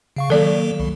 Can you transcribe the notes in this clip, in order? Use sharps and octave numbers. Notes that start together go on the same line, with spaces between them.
C#3 F5 C#6
D#3 F#3 A#3 A4 D5
C2